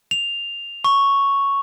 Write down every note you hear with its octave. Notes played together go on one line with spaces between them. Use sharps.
F7
C#6